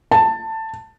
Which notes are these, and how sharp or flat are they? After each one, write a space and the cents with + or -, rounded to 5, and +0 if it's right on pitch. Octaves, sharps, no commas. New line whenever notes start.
A5 +15